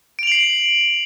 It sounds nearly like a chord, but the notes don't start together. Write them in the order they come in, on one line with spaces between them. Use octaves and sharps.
D7 F7 F#7 C7